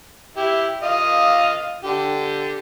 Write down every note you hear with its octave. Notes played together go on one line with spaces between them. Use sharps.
E4 G4
F4 D#5 F5
D3 G4